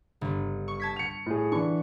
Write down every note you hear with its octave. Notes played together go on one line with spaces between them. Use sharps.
G1
C#6
A5 G#6 B6
C#7 F7
A2 G#4
D3 E3 C#6